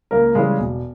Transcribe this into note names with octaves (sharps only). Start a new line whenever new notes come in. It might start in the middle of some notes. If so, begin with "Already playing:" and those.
C#2 A#3 A#4
C#3 E3 G3 G#3 G#4
E1